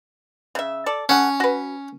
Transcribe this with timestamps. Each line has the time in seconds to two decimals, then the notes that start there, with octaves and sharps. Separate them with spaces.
0.55 C#3 E5
0.86 A4 D5
1.09 C#4 A4 F#5
1.40 F#4 B4